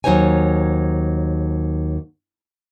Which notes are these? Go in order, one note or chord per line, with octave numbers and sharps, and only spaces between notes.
D#2 F#3 D#4 C5 C#5 G#5